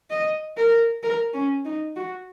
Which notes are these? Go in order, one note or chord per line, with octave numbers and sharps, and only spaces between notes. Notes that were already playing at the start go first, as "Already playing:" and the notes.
D#5
A#4
A#4
C#4
D#4
F#4